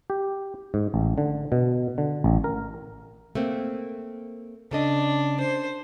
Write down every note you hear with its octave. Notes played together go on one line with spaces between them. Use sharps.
G4
G#2
A1
D3
B2
D3
A1
A#4
A3 A#3 C4
C#3 D4 A4 D#5
C5